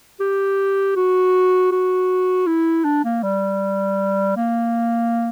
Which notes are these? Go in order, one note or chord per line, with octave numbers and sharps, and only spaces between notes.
G4
F#4
F#4
E4
D4
A#3
G3
A#3